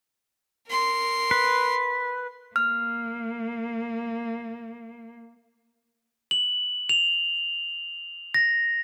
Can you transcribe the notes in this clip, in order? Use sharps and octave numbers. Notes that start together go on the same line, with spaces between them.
A#4 C6
B4
A#3 F6
F#7
F7
A#6